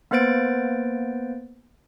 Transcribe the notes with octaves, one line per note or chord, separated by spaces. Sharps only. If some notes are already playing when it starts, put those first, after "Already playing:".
A#3 B3 B4 C5 A6 D7